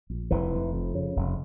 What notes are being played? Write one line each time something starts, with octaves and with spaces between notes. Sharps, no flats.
A#1
F1 E3
F1
F2
C#3
F1